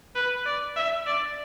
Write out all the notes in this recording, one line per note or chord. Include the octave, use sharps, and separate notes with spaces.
B4
D5
E5
D5